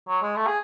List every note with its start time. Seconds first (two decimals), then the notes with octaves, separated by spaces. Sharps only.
0.09 F#3
0.22 G#3
0.36 A3
0.47 G#4